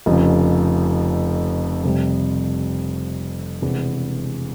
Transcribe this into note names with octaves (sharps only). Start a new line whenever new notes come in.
F1 F2 C#3 F3
F2 C3 G3
E1 E2 C3